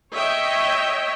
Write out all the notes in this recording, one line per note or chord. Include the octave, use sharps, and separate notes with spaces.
C#5 D#5 E5 G5